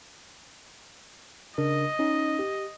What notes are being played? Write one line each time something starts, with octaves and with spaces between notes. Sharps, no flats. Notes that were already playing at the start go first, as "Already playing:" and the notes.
C#3 D4 A#4 D#5
C#4 D#4
G4